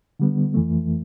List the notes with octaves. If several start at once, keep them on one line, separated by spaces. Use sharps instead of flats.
D3 G3 B3
F2 E3 A3